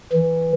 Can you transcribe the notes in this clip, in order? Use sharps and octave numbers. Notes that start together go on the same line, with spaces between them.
E3